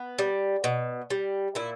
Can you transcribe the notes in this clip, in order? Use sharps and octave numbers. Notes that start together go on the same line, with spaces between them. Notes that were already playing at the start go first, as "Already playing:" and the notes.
Already playing: B3
G3
B2
G3
A#2 E4